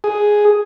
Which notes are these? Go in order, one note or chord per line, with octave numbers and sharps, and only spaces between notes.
G#4